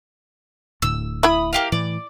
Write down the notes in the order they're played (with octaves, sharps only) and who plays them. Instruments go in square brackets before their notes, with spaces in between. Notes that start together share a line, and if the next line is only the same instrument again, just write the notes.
[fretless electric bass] D1 A2 D3 [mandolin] E6
[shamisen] E4 E5 [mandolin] B5 D#6
[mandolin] A#3 G4 F5
[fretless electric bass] A2 E3 [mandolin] D5